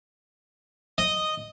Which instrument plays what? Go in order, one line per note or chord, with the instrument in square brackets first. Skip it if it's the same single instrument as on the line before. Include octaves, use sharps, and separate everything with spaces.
[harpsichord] D#5